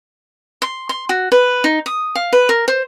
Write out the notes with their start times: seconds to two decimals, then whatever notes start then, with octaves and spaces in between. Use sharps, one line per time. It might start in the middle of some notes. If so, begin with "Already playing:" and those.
0.62 C6
0.89 C6
1.09 F#4
1.32 B4
1.64 D#4
1.86 D#6
2.15 F5
2.33 B4
2.49 A#4
2.68 C5